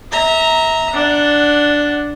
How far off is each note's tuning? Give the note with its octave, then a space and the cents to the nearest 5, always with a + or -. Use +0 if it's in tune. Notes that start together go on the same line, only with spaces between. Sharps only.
E5 -30 A#5 +0
D4 +0 F#5 +0